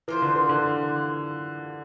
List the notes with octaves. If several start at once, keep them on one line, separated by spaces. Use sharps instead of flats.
E3 A#3 F4 C5
D3
E3
D3